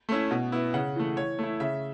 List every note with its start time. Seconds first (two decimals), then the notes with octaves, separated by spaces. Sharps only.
0.09 A3 C#4 E4
0.31 B2
0.52 B3 E4
0.74 C#3 F#5
0.96 E3 A3
1.17 E3 C#5
1.39 A3 E4
1.60 C#3 E5